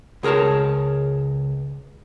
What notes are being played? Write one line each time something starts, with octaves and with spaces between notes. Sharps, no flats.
C#2 G#4 A#4 C#5 A5